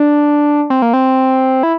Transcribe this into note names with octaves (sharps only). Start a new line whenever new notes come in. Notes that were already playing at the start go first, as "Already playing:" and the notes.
Already playing: D4
C4
A#3
C4
E4